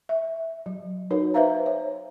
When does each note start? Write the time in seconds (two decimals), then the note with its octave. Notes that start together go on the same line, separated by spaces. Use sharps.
0.09 E5
0.66 F#3
1.11 D#4 F#4 A#4 B4 C#5
1.34 B4 C5 E5 F5 A#5
1.66 C#5